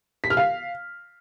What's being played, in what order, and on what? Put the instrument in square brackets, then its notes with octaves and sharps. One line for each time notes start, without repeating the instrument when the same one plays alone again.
[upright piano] B6
F6
F5